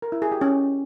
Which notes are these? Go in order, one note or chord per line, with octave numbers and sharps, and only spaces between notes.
A#4
E4
G#4
G4
C#4